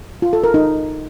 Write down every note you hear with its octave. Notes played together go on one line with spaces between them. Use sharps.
F4
A4
A#4
D#4